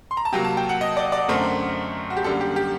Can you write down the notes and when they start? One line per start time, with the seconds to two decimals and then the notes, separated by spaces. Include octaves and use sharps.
0.11 C6
0.17 A#5
0.25 A5
0.32 C3 F#3 A#3 G5
0.44 A5
0.57 G5
0.69 F#5
0.81 D#5
0.97 D5
1.12 D5
1.28 F#2 D3 A3 C4 A#4
2.10 F#4
2.17 G4
2.24 F#2 D3 G3 A#3 A4
2.41 G4
2.56 G4